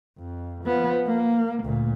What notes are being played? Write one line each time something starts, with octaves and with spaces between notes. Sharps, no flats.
F2
F3 B3
A#3
D2 A#2